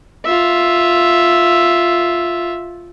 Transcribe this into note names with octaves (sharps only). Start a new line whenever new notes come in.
F4 E5